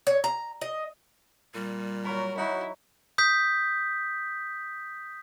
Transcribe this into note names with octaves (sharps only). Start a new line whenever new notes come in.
C#5
A#5
D#5
A#2 G3
F#3 A#4 C#5 B5
F#3 D#4 E4 F#4
D#6 G6 B6